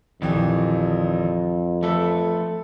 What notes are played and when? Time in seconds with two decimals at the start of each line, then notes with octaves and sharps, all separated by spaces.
0.22 A#1 F2 D#3 E3 G4
1.83 F3 A3 A4 B4 E5